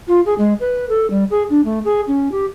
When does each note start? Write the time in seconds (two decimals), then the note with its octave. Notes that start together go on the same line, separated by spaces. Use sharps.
0.08 F4
0.26 G#4
0.38 G#3
0.60 B4
0.89 A4
1.10 G3
1.30 G#4
1.50 D4
1.65 A3
1.85 G#4
2.08 C#4
2.32 G4